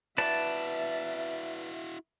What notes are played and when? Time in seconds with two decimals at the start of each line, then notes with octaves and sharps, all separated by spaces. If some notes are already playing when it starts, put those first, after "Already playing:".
0.18 E4 F#4 B4 D5 E5 A5